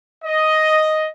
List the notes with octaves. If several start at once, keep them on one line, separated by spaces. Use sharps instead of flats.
D#5